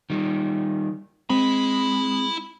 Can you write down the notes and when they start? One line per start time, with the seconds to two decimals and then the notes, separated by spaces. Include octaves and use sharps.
0.10 D#3 G3
1.30 G#3 C4 E4 B5